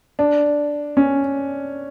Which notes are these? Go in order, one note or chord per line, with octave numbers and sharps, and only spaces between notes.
D4
C#4